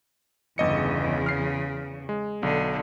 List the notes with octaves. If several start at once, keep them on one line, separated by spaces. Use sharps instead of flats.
G1 E2 C#3 D#5 C#7
F6 C7
G#3
B1 D3